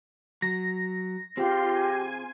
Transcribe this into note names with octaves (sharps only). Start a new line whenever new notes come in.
F#3 A#6
C4 F4 G4 G#4 C6
G#5